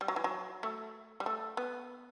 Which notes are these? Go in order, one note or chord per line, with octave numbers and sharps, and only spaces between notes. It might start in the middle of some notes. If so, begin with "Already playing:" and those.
G3
F#3
E3
F#3
A3
G3
A3
B3